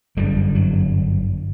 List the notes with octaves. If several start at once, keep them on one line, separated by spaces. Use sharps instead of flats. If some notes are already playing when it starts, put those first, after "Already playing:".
G1 F#2 D3 G3
F#3